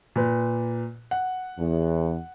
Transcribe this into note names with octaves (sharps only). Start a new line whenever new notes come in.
A#2 B4
F#5
E2